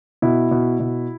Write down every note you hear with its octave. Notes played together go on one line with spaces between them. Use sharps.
B2 E4
B2
B2